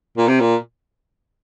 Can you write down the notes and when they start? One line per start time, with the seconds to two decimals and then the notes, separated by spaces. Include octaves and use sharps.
0.17 A#2
0.28 C3
0.40 A#2